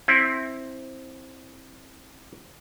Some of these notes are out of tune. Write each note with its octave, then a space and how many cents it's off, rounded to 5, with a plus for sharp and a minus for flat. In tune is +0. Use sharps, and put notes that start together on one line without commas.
C4 +15 E4 -5